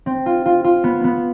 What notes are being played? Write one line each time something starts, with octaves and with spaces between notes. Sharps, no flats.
C4
F4
F4
F4
B3
B3